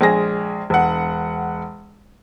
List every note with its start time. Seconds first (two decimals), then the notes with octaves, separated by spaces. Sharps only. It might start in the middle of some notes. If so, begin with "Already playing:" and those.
0.01 A#1 G#3 G#4 A#6
0.70 E1 F#5